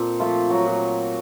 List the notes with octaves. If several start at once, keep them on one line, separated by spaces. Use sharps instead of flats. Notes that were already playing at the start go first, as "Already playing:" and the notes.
Already playing: A#2 C4 A4 C5
F3 A3 F4
F#3 F#4
A#2